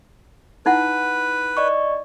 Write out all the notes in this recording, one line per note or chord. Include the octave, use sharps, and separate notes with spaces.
D#4 E4 B4 F#5
D5 D#5 C#6